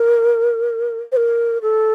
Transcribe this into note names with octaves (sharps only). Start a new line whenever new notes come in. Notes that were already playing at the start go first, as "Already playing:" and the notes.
Already playing: A#4
C5
A#4
A4